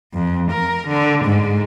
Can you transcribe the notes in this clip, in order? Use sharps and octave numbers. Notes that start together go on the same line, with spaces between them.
F2
A#4
D3
G#2